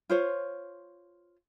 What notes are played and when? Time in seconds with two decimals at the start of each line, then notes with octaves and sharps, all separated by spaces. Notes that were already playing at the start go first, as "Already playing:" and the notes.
0.09 F4 C5 C#5